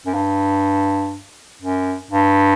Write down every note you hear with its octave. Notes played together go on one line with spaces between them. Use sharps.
F#2
G2
F#2
G2